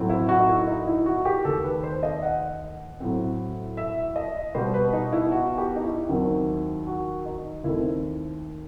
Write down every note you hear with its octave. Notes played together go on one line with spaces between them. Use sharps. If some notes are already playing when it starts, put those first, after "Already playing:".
Already playing: A2 F#3 C4
E4
F#4
D#4
E4
D#4
E4
F#4
G4
D#2 D#3 A3 A4
B4
C5
D#5
F#5
A2 F#3 C4
E5
D#5
B2 G3 B3 C5
B4
D#4
E4
F#4
G4
D#4
E4
D#2 D#3 F#3 C4
F#4
D#4
D#2 D#3 A3 C4 E4